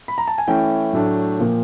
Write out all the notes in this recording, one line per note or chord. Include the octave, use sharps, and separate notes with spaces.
B5
A#5
A5
G#5
E3 A3 C#4 E4 G5
A2 F#3 A3 D4
A#2 F3 A#3